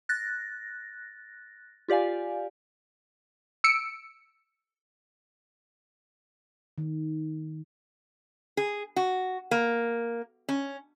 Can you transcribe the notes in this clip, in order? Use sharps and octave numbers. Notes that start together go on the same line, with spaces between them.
F#6 A6 A#6
F4 G4 D5 F5 G#5
E6 C#7 D7
D#3
G#4
F#4
A#3
C#4